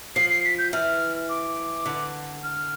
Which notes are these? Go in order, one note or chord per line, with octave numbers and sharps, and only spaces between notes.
F3 C7
C7
B6
G6
E3 F6
D6
D3
F6